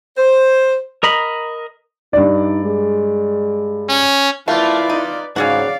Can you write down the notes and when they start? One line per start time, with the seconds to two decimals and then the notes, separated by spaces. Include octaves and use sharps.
0.16 C5
1.03 A#4 D#5 A#5 B5
2.13 G2 D#4 D5
2.64 G#3
3.89 C#4
4.48 A3 A#3 E4 F4 B4 D5
4.90 D#4
5.36 G#2 C#3 C#4 F#4 D5 F5 F#5